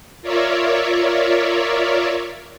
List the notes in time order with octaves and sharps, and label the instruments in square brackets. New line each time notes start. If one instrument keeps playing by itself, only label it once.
[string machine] F4 A#4 C#5 D5 E5